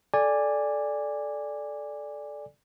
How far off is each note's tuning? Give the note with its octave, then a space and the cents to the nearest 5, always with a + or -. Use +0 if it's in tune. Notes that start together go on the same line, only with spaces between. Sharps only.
A4 -15 D5 +0 G#5 -20